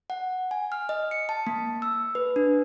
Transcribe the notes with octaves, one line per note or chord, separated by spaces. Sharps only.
F#5
G#5
F6
D#5
C#7
A5
A#3
E6
B4
D4